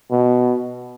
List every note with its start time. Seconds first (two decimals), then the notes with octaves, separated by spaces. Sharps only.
0.11 B2